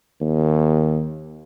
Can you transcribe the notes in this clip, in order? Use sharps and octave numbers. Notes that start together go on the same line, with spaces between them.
D#2